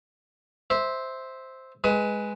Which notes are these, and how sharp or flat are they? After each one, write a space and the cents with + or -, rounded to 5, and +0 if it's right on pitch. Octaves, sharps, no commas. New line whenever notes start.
C5 +0 E5 -10
G#3 +0 B4 +0 D#6 +35